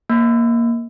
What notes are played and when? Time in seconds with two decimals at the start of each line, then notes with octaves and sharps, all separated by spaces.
0.09 A#3